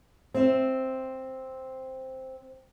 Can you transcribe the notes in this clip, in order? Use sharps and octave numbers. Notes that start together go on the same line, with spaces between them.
C4 E5